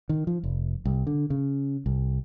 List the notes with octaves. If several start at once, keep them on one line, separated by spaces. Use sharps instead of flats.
D#3
F3
F1
C2
D3
C#3
C2